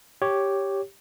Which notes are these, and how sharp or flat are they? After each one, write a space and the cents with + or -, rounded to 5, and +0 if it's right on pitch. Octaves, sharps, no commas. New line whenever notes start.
G4 +0 C#5 +0